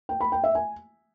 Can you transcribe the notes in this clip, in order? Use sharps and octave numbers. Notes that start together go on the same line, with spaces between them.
G5
B5
G5
E5
G#5